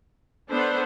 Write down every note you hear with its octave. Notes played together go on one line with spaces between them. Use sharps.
B3 D4 A4 C5